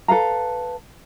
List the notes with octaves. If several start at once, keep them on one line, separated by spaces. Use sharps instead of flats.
A4 B4 F5 A#5